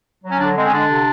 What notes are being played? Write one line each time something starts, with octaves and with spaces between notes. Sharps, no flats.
F#3
C#4
D3 D4
G#3 C4
C#4
D3 D4
C3